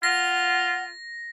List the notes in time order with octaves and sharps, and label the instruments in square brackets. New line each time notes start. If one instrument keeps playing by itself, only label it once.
[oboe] F4 [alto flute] F#5 [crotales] A#6